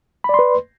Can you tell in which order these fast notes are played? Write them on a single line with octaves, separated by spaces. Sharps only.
B5 D5 C6 B4